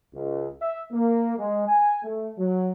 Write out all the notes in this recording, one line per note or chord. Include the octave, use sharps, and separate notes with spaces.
C#2
E5
A#3
G#3
G#5
A3
F#3